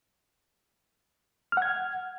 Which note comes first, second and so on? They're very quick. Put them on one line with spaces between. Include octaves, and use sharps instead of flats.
F6 F#5 G#6